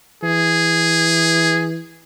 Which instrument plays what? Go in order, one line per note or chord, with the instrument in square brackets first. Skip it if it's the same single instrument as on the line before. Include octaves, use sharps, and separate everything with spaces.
[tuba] E3 [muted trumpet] G#4